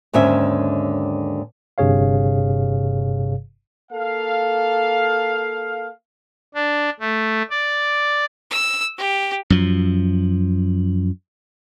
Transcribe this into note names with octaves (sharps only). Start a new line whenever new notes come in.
D#2 G#2 D3 C#4 E5
G1 G2 C3 G#4 C#5 F5
A#3 A4 F5
D4
A3
D5
E6
G4
F#2 F3